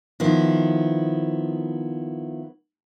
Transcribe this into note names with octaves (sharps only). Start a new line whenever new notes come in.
D#3 F3 B3 E4